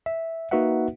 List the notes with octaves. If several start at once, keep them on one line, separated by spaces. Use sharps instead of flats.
E5
A#3 D#4 F#4 B4 E5 F#5